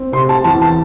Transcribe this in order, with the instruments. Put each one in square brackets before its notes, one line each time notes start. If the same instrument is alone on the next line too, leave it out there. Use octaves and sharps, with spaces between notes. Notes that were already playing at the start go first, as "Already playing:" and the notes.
Already playing: [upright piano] C4
C3 C6
A5
E2 A5
A5